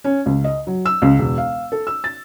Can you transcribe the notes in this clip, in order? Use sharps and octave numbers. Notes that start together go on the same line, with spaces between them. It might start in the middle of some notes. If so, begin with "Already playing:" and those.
C#4
C#2
D#5
F#3
E6
C#2
E1
F5
A4
E6
A6